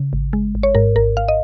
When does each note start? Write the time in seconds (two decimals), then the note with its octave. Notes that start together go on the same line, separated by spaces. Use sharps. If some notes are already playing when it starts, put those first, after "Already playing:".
Already playing: C#3
0.13 G#1
0.33 G#3
0.55 G#1
0.63 C#5
0.75 G#2 A#4
0.96 G#1 A#4
1.17 G#1 F5
1.28 D#5